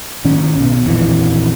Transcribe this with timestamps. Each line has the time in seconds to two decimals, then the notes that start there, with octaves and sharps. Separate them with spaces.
0.24 G#2 D#3 C#4
0.57 B1 B2
0.85 D#1 A#1 F2 E3